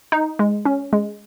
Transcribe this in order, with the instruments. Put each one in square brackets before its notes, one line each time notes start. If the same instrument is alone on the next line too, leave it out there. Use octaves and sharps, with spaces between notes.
[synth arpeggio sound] D#4
G#3
C#4
G#3